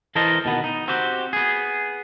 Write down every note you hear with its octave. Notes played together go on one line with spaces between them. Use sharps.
E3 A4 A#4 C5 D#5
B2 D#3 B3
D#4
C4 F#4 G4
B3 G#4